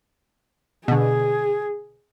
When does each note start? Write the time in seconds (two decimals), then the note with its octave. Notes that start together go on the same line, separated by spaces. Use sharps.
0.88 B2 D3 G#4